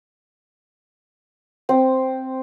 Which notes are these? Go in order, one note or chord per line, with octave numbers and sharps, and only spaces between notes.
C4